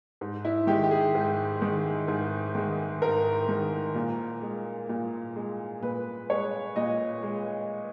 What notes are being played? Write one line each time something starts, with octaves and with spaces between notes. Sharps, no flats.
G#2
E4
D#3 G#3 G4
G4
G#4
G#2
D#3 G#3
G#2
D#3 G#3
G#2 A#4
D#3 G#3
A#2
G#3
A#2
G#3
A#2 B4
G#3 C#5
A#2 D#5
G#3